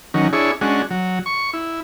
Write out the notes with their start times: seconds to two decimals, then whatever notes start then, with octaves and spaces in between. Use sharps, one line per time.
0.14 D#3 F#3 C#4
0.33 D4 E4 G#4 C#5
0.61 G#3 C#4 D4 F#4
0.91 F#3
1.26 C#6
1.54 E4